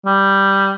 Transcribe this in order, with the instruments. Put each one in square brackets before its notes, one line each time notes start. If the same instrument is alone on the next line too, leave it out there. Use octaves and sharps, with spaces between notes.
[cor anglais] G3